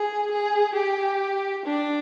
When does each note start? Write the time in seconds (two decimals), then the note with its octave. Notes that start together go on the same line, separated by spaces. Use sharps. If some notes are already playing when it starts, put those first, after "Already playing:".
Already playing: G#4
0.31 G#4
0.75 G4
1.65 D4